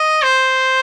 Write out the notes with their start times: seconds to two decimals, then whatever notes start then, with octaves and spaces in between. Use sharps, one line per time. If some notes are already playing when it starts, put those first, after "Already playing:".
Already playing: D#5
0.23 C5